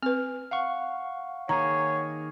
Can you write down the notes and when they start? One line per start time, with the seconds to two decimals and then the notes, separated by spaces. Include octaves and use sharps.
0.03 C4 B4 F6
0.51 F5 F#5 C#6
1.49 D#3 A#3 G#4 C#5 A#5